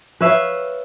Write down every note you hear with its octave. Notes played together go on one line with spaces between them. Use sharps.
B4 C#5 E5 F5